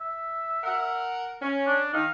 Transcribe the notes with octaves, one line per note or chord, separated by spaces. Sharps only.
E5
A#4 F#5
C#4
D4
D#3 D#4 F5